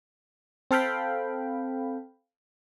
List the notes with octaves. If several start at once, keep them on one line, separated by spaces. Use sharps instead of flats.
C4 A4 F5 G5 B5